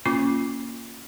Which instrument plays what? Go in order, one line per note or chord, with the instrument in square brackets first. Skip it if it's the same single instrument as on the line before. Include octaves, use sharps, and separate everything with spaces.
[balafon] A#3 C#4 F4 C#6 D6